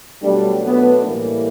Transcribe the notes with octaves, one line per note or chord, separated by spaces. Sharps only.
B2 F#3 G3 A3 D4
B3
A2 E3 G3 A#3